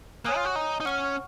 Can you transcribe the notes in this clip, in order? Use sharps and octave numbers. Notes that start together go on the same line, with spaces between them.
A#3 C#5 G#5 D#6 F#6
F4
F#4
D#4
D#4
C#4 F#5 C#6 F6